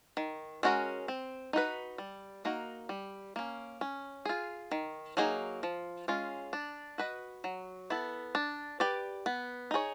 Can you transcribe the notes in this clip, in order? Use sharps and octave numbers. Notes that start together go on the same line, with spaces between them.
D#3
G#3 C#4 F#4 A#4
C4
D#4 F#4 B4
G3
A#3 D#4 F#4 A#4
G3
A#3 C#4
C#4
F4 G#4
D#3
F#3 A#3 D#4 G#4
F3
G#3 C#4 F4
D4
F#4 B4 D#5
F#3
B3 E4 A4
D4
G4 B4 D5
B3
D#4 G#4 C#5